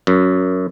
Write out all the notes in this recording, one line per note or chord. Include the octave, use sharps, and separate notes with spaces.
F#2